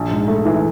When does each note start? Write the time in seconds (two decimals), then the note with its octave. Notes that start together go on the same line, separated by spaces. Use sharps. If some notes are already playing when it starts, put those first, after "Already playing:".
Already playing: A#1
0.11 G#2
0.28 A3
0.45 E3